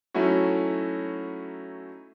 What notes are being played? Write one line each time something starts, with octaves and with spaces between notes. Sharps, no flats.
F#3 A3 C#4 D#4 E4 F#4